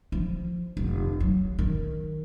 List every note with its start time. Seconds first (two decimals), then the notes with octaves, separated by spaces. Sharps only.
0.12 F3
0.77 F1
1.20 F#3
1.59 D#3